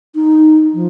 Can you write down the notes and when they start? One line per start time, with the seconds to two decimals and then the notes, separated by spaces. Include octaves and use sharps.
0.15 D#4
0.74 F3